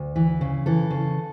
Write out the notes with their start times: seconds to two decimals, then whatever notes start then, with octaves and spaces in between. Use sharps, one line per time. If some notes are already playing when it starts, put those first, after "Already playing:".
Already playing: D2
0.16 E3
0.41 C#3
0.66 E3 A4
0.90 C#3